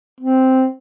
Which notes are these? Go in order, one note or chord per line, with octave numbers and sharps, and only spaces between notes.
C4